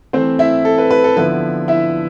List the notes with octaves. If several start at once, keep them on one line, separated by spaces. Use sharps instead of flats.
E3 A3 C4 C5
E4 E5
A4
B4
B4
A4
D3 F3 B3 E4 B4
E4 E5